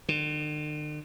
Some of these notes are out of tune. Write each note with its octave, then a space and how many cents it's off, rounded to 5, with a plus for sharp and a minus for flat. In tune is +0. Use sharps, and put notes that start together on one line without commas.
D3 +45